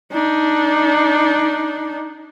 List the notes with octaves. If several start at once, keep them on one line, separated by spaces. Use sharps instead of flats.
D4 D#4